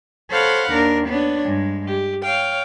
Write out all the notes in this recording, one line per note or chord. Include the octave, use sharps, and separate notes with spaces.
A4 C5 C#5 F5 F#5 B5
D#2 D4 A#4
B3 D4 C#5
G2 G#3
G4
C#5 F5 G5